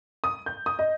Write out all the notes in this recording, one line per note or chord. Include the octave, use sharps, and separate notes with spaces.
D#6
G6
D#6
D#5